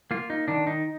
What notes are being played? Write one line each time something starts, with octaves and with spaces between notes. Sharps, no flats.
A#3 F4
D#4
D#3 D4
D#4